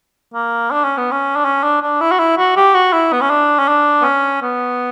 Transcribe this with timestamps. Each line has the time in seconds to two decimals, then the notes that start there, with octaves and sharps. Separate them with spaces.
0.34 A#3
0.71 D4
0.85 C#4
0.98 B3
1.11 C#4
1.36 D4
1.45 C#4
1.63 D4
1.82 D4
2.01 E4
2.11 F#4
2.20 E4
2.38 F#4
2.56 G4
2.75 F#4
2.93 E4
3.13 B3
3.21 C#4
3.30 D4
3.59 C#4
3.68 D4
4.01 B3
4.04 C#4
4.42 B3